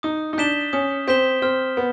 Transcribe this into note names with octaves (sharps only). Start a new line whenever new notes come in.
D#4 D#6
D#4
D4 G6 B6 E7 G7
C#4 D#6
C4 G6 B6 E7 G7
C4 F6
B3